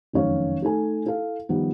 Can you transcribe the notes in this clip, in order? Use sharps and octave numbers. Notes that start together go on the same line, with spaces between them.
F1 F#2 D#3 C#4 C#5 F5
A3 D#4 A4 G#5
E4 A4 F5
D#3 F3 G3 B3